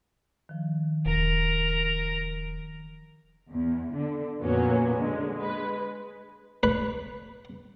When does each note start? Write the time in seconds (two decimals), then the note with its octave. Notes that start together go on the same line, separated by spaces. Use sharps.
0.49 D#3 F3
1.06 E1 A#4 A#5
3.50 E2
3.93 D3
4.41 F2 A#2 F#3 A#3 B3 C#4
4.95 D3 G#3
5.38 G#3 B4
6.63 B4